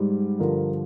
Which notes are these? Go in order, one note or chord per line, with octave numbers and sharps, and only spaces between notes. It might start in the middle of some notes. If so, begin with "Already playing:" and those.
Already playing: G#2 G3
G2 D3 F3 A#4